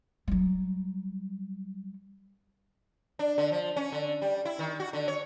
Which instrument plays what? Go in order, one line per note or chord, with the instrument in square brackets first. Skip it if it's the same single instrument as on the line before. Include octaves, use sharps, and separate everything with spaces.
[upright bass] F#3 G3
[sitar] D4
D3
F3
C#4
D3
G3
E4
D#3
F#4
D3
C#5